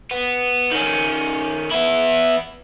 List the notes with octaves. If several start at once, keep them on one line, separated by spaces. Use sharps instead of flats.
B3
D#3 C#4
B3 E4